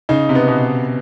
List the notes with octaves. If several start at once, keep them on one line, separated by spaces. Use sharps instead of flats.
C#3 D#4
C3
B3
B2